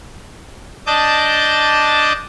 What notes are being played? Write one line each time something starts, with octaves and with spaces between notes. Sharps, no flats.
D4 D#5 A5 D6 G6